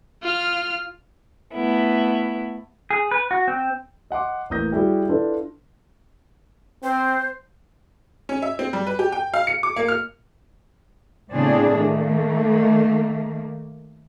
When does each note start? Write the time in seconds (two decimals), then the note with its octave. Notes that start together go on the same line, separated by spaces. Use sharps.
0.23 F4 F6
1.53 A3 B3 E4
2.90 G#4
3.11 B4
3.31 F#4
3.48 C4
4.10 D#5 F#5 C6 D6
4.50 A1 A#3 D#6 G6 A#6
4.72 G3 E4 F#4 G#4
5.09 D4 E4 F4 A4 B4
6.83 C4 C5
8.29 C#4
8.42 E5
8.59 C4
8.73 G3
8.87 B4
8.99 G4
9.12 G5
9.34 F5
9.47 C#7
9.63 D6
9.76 A#3
9.88 F6
11.33 A2 C#3 B3 C4 D4 G#4
11.78 D#3 A3 A#3